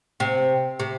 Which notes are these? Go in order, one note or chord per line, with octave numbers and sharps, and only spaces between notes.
C3
C3